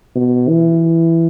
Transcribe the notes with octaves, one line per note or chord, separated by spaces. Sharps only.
B2
E3